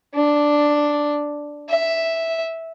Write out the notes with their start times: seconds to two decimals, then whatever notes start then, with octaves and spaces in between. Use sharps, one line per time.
0.15 D4
1.70 E5